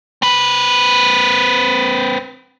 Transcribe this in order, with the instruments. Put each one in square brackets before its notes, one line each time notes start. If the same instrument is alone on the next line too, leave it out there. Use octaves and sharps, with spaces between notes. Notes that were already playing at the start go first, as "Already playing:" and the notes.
[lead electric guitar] C4 B4